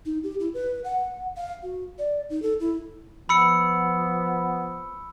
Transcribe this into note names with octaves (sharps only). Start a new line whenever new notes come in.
D#4
G4
E4
B4
F#5
F5
F#4
D5
D#4
A4
E4
F3 B3 B5 E6 C#7